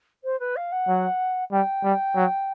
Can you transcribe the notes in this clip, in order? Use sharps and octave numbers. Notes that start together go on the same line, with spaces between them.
C5
B4
F5
F#5
F#3
G3 G5
G3
F#3